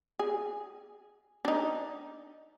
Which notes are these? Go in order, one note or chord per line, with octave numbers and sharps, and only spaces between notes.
G#4
D4 D#4